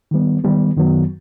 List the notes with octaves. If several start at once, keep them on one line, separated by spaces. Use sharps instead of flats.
D#3 G3 B3
D#3 G3 B3
F#2 D#3 F#3 B3